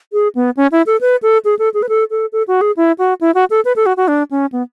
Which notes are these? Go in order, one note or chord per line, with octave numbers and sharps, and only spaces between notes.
G#4
B3
C#4
E4
A4
B4
A4
G#4
A4
G#4
B4
A4
A4
A4
F#4
G#4
E4
F#4
E4
F#4
A4
B4
A4
F#4
F#4
D4
C#4
B3